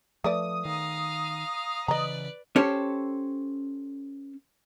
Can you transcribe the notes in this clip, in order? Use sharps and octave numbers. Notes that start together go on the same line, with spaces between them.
F3 A3 B4 D5 D#6
D#3 F5 A#5
C#3 E3 B4 D5 D#5 A#5
C#4 G4 A4 C5 C#5